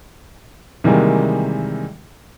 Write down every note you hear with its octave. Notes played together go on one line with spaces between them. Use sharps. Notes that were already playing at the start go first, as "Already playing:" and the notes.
C3 D#3 E3 G3 G#3 A#3